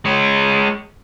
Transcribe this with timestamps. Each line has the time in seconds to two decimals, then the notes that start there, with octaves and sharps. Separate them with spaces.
0.05 G#3 C#5